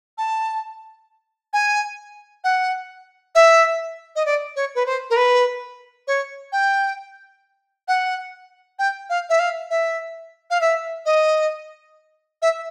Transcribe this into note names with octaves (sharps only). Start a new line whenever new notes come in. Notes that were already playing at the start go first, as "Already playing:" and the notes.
A5
G#5
F#5
E5
D#5
D5
C#5
B4
C5
A#4
B4
C#5
G5
F#5
G5
F5
E5
F5
E5
F5
E5
D#5
E5